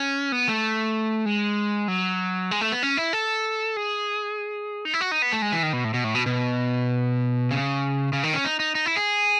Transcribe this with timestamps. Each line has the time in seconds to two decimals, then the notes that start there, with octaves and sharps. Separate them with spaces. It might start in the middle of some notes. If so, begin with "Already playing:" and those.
Already playing: C#4
0.32 B3
0.49 A3
1.26 G#3
1.88 F#3
2.51 G#3
2.61 A3
2.72 B3
2.83 C#4
2.97 E4
3.13 A4
3.77 G#4
4.85 D#4
4.94 E4
5.01 F#4
5.11 D#4
5.22 B3
5.33 A3
5.42 G#3
5.53 E3
5.63 D#3
5.73 B2
5.84 A2
5.94 B2
6.04 A2
6.15 B2
6.26 B2
7.51 C#3
8.13 C#3
8.23 D#3
8.34 C#4
8.45 D#4
8.60 D#4
8.75 D#4
8.86 E4
8.97 G#4